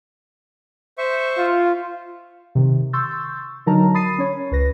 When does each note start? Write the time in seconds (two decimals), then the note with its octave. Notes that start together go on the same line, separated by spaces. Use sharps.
0.98 C5 E5 C#6
1.38 F4
2.55 C3 D#3
2.93 C6 C#6 E6 G6 A6
3.66 D3 F#3 D#4 A#4 A5 A#5
3.94 B5 D#6 A6 C7 D#7
4.18 C#4 C#5
4.51 C#2 B4 A#6